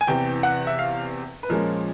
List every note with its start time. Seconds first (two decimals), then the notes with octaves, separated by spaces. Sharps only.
0.01 G#5
0.07 E2 C3 E3 G5
0.43 F#5
0.67 E5
0.79 F5
1.43 B4
1.49 A#2 F3 G#3 C#4 A#4